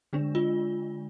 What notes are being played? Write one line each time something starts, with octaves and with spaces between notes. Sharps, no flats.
D3 G#3 D4
F4